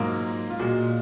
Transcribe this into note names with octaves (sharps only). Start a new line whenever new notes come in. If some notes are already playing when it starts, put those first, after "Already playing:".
Already playing: G#2 F#3 A#3 F4
F4
A#2 G#3 F#4